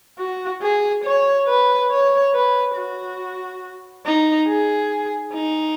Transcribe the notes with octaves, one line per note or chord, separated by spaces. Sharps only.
F#4
G#4
C#5
B4
C#5
B4
F#4
D#4
G#4
D#4